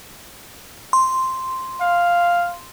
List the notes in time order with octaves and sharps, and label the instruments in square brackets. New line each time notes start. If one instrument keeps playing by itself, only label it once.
[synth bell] C6
[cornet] F5